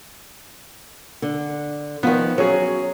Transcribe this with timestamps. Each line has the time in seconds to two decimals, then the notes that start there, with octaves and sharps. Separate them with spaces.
1.22 D3
2.03 D#3 F3 B3
2.38 F#3 C#4 G#4